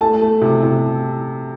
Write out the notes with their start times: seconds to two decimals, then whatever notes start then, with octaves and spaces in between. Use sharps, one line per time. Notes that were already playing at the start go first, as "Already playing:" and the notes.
0.01 A3 A5
0.22 A3
0.41 C3
0.63 C3